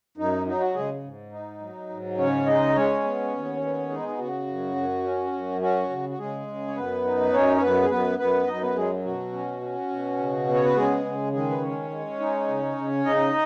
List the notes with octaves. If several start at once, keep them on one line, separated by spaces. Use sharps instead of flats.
F#2 D#4
F#3 D#4
F#4
C#3 G#3 G#4
G#2
D#4
F#3
G#2
C#3 C#4 C#5
G#3 D#4 D#5
G#3 C#4 C#5
B3
D#2
B3
G#3 D#4 G#4
D#4
C#3 F#4
F#2
F#2
C#4
F#2
C#4 F#4
C#3
F#4
C#3 G#3 G#4
C#3
C#5
F#2 B3 B4
D#4
F#2 C#4 C#5
C#5
F#2 B3 B4
G#4
F#2 B3 B4
F#2 B3 B4
F#2 D#4 D#5
B3 B4
F#3 G#3 G#4
B2 F#4
C#4
C#4
B2
C#3
B3
C#5
B4
C#3 G#3 G#4
C#3
D#3 G#3 G#4
B4
G#3 C#4 C#5
G#3
D#4
C#3
C#3
C#3 D#4 D#5